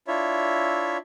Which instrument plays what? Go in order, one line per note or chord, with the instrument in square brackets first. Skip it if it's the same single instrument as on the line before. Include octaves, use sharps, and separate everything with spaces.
[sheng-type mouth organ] D4 E4 F4 C#5 E5